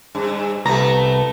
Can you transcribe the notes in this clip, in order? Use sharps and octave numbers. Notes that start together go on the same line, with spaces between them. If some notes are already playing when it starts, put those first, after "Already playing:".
G2
C2 A3 B3 A#5